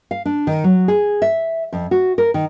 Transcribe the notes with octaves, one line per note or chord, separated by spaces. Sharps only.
F5
D4
D#3
F#3
G#4
E5
F2
F#4
A#4
D#3